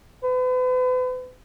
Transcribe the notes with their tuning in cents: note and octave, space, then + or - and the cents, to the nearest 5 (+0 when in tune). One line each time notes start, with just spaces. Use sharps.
B4 +40